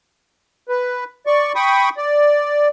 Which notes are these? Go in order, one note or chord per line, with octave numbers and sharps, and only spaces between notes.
B4
D5 C#6
G5 B5 C#6 D#6
D5